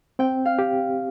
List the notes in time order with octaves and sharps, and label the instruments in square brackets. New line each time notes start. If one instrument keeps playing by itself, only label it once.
[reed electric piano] C4 [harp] G5
[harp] F5
[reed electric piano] G4